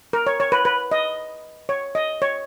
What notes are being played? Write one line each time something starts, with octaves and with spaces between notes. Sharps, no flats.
A#4
C#5
C#5
B4
B4
D#5
C#5
D#5
C#5